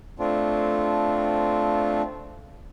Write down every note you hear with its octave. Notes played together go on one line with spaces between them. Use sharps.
A3 C4 D4 F4